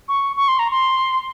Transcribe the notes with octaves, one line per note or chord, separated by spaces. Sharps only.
C#6
C#6
C6
A#5
C6